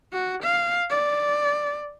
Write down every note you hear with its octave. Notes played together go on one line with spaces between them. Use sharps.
F#4
F5
D5